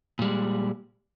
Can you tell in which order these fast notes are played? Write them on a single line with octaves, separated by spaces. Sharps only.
A#2 G3 G#3